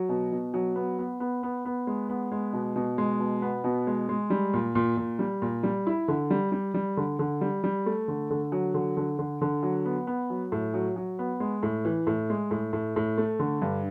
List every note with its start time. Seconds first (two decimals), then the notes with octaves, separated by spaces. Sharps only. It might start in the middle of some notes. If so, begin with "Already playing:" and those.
Already playing: F#3
0.09 B2
0.32 B2
0.54 F#3
0.76 B3
0.99 B3
1.20 B3
1.43 B3
1.65 B3
1.87 G#3
2.09 B3
2.32 G#3
2.53 B2
2.76 B2
2.98 G#3
3.19 B2
3.42 B3
3.64 B2
3.87 G#3
4.09 G#3
4.30 G3
4.54 A#2
4.75 A#2
4.97 A#2
5.19 G3
5.42 A#2
5.63 G3
5.87 E4
6.08 D3
6.30 G3
6.52 G3
6.74 G3
6.97 D3
7.19 D3
7.41 G3
7.64 G3
7.86 A3
8.08 D3
8.30 D3
8.52 F#3
8.74 D3
8.97 D3
9.19 D3
9.42 D3
9.63 F#3
9.85 B3
10.07 B3
10.30 F#3
10.52 A2
10.74 F#3
10.96 F#3
11.19 B3
11.40 G#3
11.63 A2
11.85 E3
12.07 A2
12.30 G#3
12.51 A2
12.73 A2
12.96 A2
13.18 A3
13.39 D3
13.62 G2